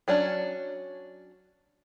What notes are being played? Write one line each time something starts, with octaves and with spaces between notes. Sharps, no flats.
F#3 C#4 D4